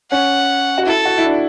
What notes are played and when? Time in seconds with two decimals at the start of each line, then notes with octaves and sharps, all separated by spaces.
0.12 C#4 F#5
0.78 F#4
0.86 E4 A4
1.05 F#4
1.18 E4
1.24 D4